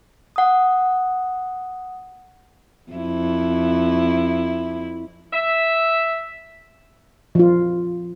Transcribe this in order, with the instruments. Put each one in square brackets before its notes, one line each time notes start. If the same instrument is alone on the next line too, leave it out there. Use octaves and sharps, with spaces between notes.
[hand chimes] F#5 D#6
[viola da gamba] F2 E4
[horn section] E5
[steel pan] F3 F4